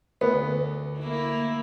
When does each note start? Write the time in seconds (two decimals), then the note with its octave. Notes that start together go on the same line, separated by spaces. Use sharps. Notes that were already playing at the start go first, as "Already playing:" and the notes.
0.21 D2 B3
1.00 A#3 E4